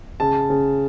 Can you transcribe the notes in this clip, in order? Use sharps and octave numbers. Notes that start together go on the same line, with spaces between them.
C#3 A5
C#3